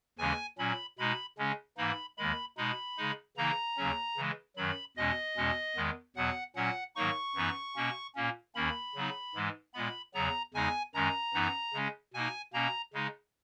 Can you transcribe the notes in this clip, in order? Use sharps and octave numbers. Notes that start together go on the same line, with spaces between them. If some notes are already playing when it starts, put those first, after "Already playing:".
D#2 C#3 E3 G#3 C#4 G#5
A#2 F#3 C#4 B5
B2 G#3 D#4 B5
C#3 G#3 C#4
G#2 E3 A#3 D#4 B5
D#2 D#3 G#3 B5
B2 G#3 D#4 B5
C#3 G#3 D#4
C#3 E3 A#3 D#4 A#5
D#2 C#3 F#3 C#4
C#3 E3 G#3
F#2 D#3 F#3 B5
E2 B2 G#3 C#4 D#5
E2 B2 G#3 C#4
E2 D#3 G#3 B3
E2 B2 F#3 B3 F#5
A#2 F#3 C#4 F#5
G#2 D#3 F#3 A#3 D#4 C#6
F#2 E3 B3 D#4
B2 A#3 C#4
A#2 A#3 C#4
D#2 D#3 A#3 C#4 B5
C#3 F#3 B3 D#4
G#2 E3 G#3
A#2 G#3 B3 B5
E2 C#3 F#3 B3 A#5
E2 C#3 G#3 D#4 G#5
F#2 D#3 G#3 C#4 A#5
F#2 E3 B3 D#4
C#3 G#3 C#4
B2 A#3 D#4 G#5
B2 A#3 C#4 A#5
C#3 G#3 D#4